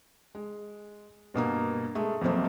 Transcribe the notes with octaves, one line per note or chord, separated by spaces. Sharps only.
G#3
G2 B2 A#3 A#5
G#3 A3 G#4
F2 B2 F#3 A3 A#3 C4